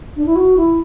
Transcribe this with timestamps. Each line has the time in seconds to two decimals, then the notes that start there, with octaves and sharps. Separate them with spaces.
0.16 D4
0.26 E4
0.36 F#4
0.57 E4